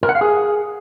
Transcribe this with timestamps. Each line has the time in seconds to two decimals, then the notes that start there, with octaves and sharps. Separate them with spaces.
0.03 A#4
0.09 F#5
0.15 F5
0.21 G#4